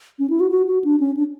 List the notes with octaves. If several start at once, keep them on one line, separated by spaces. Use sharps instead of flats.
C#4
E4
F#4
F#4
F#4
D4
C#4
D4